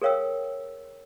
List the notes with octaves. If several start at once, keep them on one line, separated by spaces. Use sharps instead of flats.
G#4 A#4 C#5 F5 G5 E6